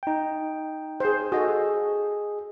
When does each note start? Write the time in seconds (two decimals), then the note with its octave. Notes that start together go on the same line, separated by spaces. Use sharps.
0.03 D#4 G5
1.00 G#4 C5
1.32 F#4 G#4 A4 D#5